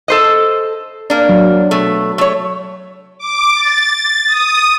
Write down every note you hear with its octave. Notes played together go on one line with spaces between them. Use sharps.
A4 C5 D#5
A#3 D4
F#3
B2 A3
A3 C#5
D6
A6
D#6